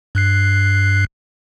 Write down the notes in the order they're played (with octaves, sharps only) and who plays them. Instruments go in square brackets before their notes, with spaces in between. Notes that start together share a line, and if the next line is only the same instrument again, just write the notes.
[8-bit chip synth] G2 F#6 C7